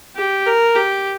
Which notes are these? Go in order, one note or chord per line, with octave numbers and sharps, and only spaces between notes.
G4
A#4
G4